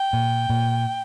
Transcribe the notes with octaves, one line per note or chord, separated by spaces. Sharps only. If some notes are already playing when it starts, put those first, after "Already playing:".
Already playing: G5
A#2
A#2